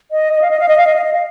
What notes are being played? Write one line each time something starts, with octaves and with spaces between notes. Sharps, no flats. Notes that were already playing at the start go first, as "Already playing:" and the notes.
D#5
D#5
F5
D#5
F5
D#5
F5
D#5
F5
D#5
F5